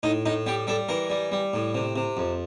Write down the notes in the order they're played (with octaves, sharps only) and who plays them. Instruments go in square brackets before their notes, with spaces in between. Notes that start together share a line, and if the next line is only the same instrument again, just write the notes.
[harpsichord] A2 D#4
A2 D#4
G3 G4
G3 A4
E3 A#4
G3
G3
A2
C3
C3
F2